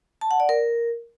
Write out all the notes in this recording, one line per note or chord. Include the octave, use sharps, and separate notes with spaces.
A5
F#5
D5
A#4